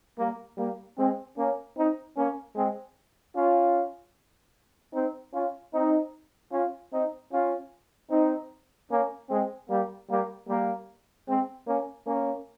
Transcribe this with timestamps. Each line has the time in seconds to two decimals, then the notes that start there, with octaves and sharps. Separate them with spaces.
0.18 G3 A#3
0.58 G3 A#3
0.97 G#3 C4
1.37 A#3 C#4
1.77 C4 D#4
2.17 A#3 C#4
2.56 G#3 C4
3.35 C#4 F4
4.94 C4 D#4
5.33 C#4 F4
5.72 C4 D#4
6.52 C#4 F4
6.92 C4 D#4
7.32 C#4 F4
8.11 C4 D#4
8.90 A#3 C#4
9.30 G#3 C4
9.69 G3 A#3
10.09 G3 A#3
10.48 G3 A#3
11.27 G#3 C4
11.67 A#3 C#4
12.07 A#3 C#4